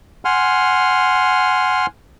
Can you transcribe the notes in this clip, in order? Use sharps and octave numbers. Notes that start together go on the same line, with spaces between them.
F#5 G#5 C6 F6